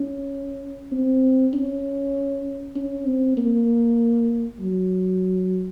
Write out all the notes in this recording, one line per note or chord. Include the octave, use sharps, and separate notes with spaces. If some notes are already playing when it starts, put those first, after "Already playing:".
Already playing: C#4
C4
C#4
C#4
C4
A#3
F#3